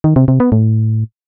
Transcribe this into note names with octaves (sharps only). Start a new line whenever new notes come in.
D#3
C3
C3
B3
A2